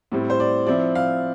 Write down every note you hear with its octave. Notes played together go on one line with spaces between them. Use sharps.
A2 G3 C4
C5
D5
F3 C4 E4 D5
F5